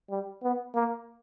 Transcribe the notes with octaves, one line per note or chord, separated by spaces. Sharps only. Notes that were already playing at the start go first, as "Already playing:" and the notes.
G3
B3
A#3